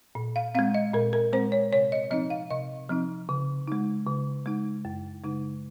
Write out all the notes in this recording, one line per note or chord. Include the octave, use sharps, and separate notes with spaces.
A#2
F5
G#3 C4 F5
D#5
A#2 A#4
A#4
G#3 C4 C5
C#5
C3 C#5
D#5
F3 C4 D#4 D#5
F5
C3 D#5
F3 C4 D#4
C#3
G#3 D#4
C#3
G#3 D#4
F#2
C#3 G#3 D#4